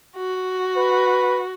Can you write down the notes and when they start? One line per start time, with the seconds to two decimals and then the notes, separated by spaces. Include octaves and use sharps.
0.17 F#4
0.76 B4